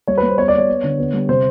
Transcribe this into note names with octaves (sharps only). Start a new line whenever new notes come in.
G3 C#5
B4
G3
C5
B3 C#5
D5
B3 C#5
B3
D3
B3
G3
C3 C5